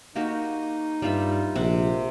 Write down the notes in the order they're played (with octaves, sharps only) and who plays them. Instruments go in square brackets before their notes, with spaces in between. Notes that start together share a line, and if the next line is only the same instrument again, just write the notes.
[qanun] A#3 F#4 G4 [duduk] D#4
[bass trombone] G2 [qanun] G3 F4 E5
[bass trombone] A#1 [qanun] C3 F#5